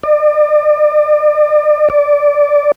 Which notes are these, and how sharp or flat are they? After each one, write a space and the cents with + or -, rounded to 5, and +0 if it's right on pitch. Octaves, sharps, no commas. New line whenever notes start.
D5 +40
D5 -10